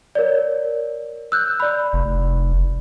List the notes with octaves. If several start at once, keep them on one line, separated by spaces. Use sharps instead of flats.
A#4 C#5 D5
E6 F#6 G6
D5 B5
F1